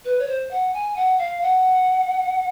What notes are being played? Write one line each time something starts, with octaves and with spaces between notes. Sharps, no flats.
B4
C#5
C5
F#5
G#5
F#5
F5
F#5